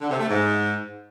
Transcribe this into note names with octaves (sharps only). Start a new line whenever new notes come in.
D3
C3
A3
G#2